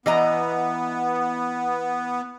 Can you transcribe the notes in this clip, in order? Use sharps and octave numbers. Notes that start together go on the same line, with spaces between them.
E3 B3 D#5 A#5